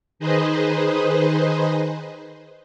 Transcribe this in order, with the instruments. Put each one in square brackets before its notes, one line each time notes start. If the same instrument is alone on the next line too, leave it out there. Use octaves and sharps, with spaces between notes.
[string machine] D#3 D#4 G#4 B4 C5 D#5